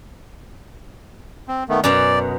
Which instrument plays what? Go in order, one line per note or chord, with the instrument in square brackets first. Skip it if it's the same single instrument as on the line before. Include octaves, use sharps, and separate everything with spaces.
[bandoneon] C4
D#3 A3 B3
[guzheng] F#2 B2 [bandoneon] D5